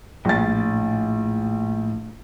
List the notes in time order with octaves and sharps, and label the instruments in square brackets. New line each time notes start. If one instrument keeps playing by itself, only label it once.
[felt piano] A#1 A6 [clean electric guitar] A2